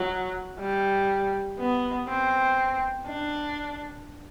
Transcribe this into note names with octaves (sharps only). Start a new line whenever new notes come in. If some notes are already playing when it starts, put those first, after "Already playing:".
Already playing: F#3
G3
B3
C4
D4